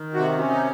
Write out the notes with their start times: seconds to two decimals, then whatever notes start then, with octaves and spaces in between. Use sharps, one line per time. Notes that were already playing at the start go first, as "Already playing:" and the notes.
Already playing: D#3
0.15 C3 F#4
0.39 C#4
0.50 D#4